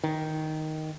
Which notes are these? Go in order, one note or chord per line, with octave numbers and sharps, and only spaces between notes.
D#3